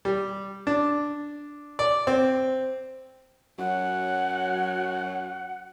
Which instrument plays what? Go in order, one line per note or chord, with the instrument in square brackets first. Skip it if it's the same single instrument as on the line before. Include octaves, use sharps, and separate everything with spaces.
[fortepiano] G3
D4
D5
C4
[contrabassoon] F#2 [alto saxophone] F#3 [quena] F#5